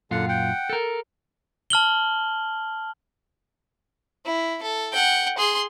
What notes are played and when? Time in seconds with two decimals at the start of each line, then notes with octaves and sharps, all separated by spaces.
0.11 F#2 A#2 D3 F4 F#5
0.29 F#5 G5
0.69 A4 A#4
1.70 A5 F6 F#7 G7
4.26 E4
4.63 A4
4.92 F#5 G5
5.38 G#4 C6